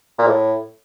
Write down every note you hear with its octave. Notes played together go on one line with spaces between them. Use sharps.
A#2
A2